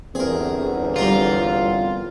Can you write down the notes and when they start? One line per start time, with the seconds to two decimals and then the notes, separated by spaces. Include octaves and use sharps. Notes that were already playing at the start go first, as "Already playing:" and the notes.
0.15 G1 E2 C4 G#4 A#4
0.96 G3 F4 A#4 A#5